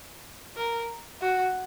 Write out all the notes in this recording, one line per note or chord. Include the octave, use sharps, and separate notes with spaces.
A#4
F#4